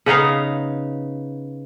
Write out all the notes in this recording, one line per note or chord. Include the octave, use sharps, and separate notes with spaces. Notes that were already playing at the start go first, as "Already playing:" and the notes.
C#3 B3 D#4 F5